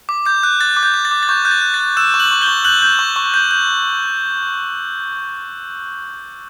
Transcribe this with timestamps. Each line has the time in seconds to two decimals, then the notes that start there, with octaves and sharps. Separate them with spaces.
0.09 D6
0.26 D6 G6
0.43 F#6
0.60 F#6 A6
0.77 D6
0.83 G6
0.94 D6
1.05 A6
1.11 D6
1.23 A6
1.28 C#6 G6
1.45 F#6 G6
1.51 A6
1.62 F#6
1.74 A6
1.80 F#6
1.97 E6 F#6 E7
2.14 C#6
2.19 F#6 F#7
2.31 C#6
2.41 G6 G7
2.48 C#6
2.64 F#6 G6 F#7
2.82 G6
2.99 C#6
3.16 C#6
3.34 G6
3.51 G6